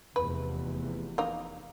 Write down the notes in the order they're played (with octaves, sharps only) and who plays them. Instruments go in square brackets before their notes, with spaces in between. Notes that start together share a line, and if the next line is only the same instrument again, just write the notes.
[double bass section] F1 E2 [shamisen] B4
[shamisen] A#3 D#4